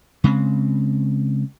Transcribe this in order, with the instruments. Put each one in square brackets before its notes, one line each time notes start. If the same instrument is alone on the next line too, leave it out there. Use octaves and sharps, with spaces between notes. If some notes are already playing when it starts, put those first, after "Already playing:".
[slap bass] C#3 G#3 C4